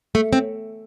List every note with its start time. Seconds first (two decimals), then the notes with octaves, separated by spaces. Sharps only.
0.15 A3
0.33 C4